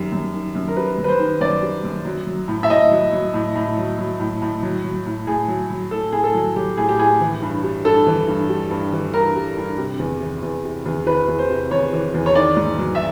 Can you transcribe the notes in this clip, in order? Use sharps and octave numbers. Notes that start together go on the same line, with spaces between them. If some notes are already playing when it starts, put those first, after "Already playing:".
Already playing: F#2 D#3 G3
F#2
D#3
F#2
A#4
G3 B4
F#2
B4
C5
D#3
F#2 D5
G3
F#2
F#3
F#3
A2
E5
A2 D#5
F#3
F#3
A2
A2
F#3
F#3
A2
A2
F#3
F#3
A2
A2 G#4
F#3
F#3
A2 A4
A2 G#4
A4
F#3
F#3 G4
A2 G#4
G4
A2 G#4
E3
G2
G3
G2 A4
E3
G2
G3
G2
E3
G2 A#4
G3
G2
C3
E2
E3
E2
C3
E2
E3 B4
E2
C5
C3
E2 C#5
E3
E2
C#5
D#3 D5
G#2
F#3
E5